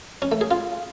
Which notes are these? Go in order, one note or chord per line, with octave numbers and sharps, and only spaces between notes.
C#4
A3
G#4
F4